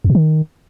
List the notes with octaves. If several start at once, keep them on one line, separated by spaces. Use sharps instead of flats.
E2
A#2
D#3